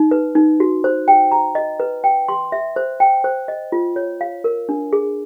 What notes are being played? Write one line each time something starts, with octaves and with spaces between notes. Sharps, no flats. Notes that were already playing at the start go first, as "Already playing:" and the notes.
Already playing: D#4
B4
D#4
F#4
C5
G5
A#5
D#5
B4
G5
C6
E5
C5
G5
C5
D#5
F4
C#5
F5
A#4
D4
G#4